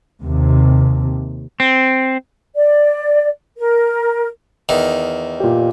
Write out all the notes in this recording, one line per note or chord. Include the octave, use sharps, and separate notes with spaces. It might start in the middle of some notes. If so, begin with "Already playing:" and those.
D#2 C3
C4
D5
A#4
E2 D#3
A#2 G4